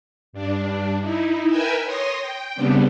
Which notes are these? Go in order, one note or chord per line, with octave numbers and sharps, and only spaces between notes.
G2 D4
D#4 E4
A#4 B4 E5 G5 G#5 E6
C#5 C6 D#6 A#6
G5
C#3 G3 B3 C4 D4